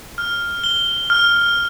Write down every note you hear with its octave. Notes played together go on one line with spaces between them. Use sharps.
F6
G7
F6